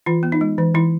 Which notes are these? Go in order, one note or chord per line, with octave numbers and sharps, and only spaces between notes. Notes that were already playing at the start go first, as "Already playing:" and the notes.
E3 F4
B3
D#4
G#3
E3
E3 E4